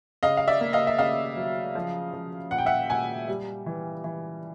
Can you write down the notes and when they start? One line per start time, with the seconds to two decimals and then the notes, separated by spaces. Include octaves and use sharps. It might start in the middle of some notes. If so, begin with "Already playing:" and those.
0.23 C#3 D#5 F5
0.37 F5
0.48 D5 E5
0.61 A#3
0.73 D#5 F5
0.87 E5
0.98 C#3 D#5 F5
1.36 F#3
1.75 F3
2.13 F3
2.51 A#2 F#5
2.58 G5
2.66 E5 F#5
2.90 A#2 F#5 G#5
3.28 G3
3.66 E3
4.04 E3